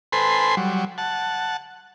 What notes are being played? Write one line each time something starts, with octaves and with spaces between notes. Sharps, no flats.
A4 B4 C5 G#5 B5 C6
F#3 G3
F#5 A5